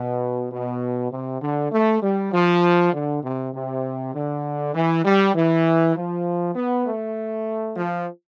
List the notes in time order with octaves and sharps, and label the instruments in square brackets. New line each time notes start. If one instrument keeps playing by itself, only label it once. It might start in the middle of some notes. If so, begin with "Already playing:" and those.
Already playing: [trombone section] B2
B2
C3
D3
A3
G3
F3
D3
C3
C3
D3
E3
G3
E3
F3
B3
A3
F3